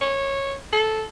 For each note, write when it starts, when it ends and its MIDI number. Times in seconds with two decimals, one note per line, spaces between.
0.01 0.56 73
0.73 1.03 69